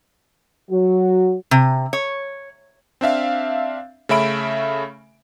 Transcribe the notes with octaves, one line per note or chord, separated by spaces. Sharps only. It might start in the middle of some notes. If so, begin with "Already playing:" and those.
F#3 F#4
C3
C#5
C4 D4 E5 F5
C#3 A3 C#4 E5 B5 D7